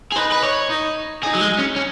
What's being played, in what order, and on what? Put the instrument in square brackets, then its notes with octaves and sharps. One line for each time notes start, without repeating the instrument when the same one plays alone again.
[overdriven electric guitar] G#4
[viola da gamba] D#4 [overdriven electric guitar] B4
[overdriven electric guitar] B4
C#5
[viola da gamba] D#4
[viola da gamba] D#4 [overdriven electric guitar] G#4
[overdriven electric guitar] F#3
G#3
C#4
C#4